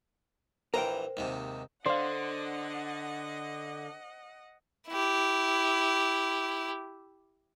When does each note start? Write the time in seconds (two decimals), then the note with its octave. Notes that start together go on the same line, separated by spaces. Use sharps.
0.74 A#1 E3 A#4 C5 G5 A#5
1.17 D#2 G#2 C3
1.86 D3 C5 D5 D#5 F5 F#5
4.88 E4 G4